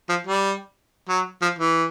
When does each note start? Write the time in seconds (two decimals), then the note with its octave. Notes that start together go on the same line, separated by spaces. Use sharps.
0.09 F3
0.27 G3
1.09 F#3
1.42 F3
1.59 E3